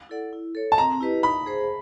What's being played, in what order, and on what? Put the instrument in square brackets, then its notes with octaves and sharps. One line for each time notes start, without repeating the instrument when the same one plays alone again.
[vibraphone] E4 A4 D5 F#5
E4
A4 C#5
[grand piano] A5
[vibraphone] C4 [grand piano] A#5
[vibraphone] E4 G4 B4 D#5
[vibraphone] D#4 [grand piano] B5
[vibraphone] G#4 C5